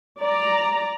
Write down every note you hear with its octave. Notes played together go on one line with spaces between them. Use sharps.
D5 A#5